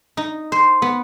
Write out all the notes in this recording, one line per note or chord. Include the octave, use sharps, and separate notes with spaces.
D#4
C5
B3